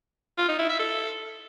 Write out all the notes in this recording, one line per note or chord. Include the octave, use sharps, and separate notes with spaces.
F4
D#4
E4
E5
A4